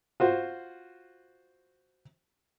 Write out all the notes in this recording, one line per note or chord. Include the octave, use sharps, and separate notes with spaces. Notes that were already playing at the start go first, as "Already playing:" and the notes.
F4 F#4 C5